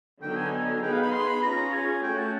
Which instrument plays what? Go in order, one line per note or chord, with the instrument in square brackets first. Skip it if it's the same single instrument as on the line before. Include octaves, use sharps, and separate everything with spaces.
[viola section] D3 F#3 B3 D#4 [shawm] G5
[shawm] G#5
G#5
[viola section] B3 D#4 G#4 B4 [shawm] G5
[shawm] F5
B5
C6
B5
[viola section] C#4 F4 G#4 [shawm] A#5
[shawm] G#5
[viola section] A3 C#4 F#4 [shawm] G5
[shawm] A5